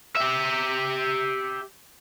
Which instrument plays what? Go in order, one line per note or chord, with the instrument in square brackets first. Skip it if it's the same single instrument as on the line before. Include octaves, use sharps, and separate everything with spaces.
[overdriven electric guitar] G4 E5